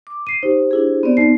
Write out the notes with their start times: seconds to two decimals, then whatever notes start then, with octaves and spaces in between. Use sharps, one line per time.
0.07 D6
0.27 C7 D#7
0.43 D#4 G4 C5
0.71 D4 E4 G#4
1.03 B3 C4 D5
1.17 D#4 C7